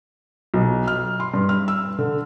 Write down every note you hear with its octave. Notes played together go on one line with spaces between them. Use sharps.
B1
F6
C6
G2
F6
E6
D3